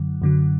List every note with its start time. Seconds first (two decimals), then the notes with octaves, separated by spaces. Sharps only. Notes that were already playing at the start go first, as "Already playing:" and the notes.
Already playing: F#2 D3 F#3
0.22 F#2 D3 F#3